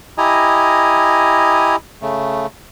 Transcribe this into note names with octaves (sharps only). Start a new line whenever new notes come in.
E4 G4 D#5 G#5 A#5 D#6
C#3 A3